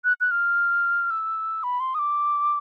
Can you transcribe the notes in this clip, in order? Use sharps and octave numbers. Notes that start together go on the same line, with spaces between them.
F#6
F#6
F6
E6
B5
C6
D#6
D6